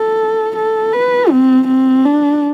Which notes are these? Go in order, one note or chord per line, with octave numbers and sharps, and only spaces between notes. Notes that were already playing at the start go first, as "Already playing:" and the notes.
Already playing: A4
A4
B4
C4
C4
D4